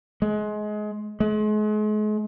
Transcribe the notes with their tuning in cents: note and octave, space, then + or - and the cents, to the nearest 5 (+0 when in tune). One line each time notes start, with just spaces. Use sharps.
G#3 +25
G#3 +40